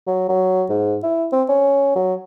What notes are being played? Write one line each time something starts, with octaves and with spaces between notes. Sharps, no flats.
F#3
F#3
G#2
E4
C4
C#4
F#3